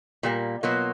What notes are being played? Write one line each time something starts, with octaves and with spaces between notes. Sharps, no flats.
A#2 G3 A#3
B2 F#3 A#3 F4